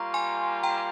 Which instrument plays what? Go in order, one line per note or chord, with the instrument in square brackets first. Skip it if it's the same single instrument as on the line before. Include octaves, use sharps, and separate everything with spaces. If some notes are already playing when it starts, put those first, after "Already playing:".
Already playing: [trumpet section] G3 A#3 F4 [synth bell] A#5 C#6
[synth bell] G#5 C6
G5 A#5